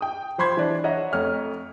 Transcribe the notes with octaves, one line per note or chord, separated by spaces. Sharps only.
G5 D#6
F3 C5 B5 C6 G#6
E3 D4
C#5 D#5 E5 F#5 A#5
F2 A3 C#5 F6